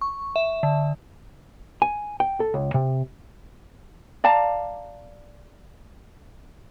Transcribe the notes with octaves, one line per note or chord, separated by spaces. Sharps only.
C#6
E5
D3
G#5
G5
A4
C#2
C3
D5 F5 A5 A#5